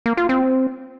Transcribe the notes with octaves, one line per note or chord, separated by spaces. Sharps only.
A#3
F4
C4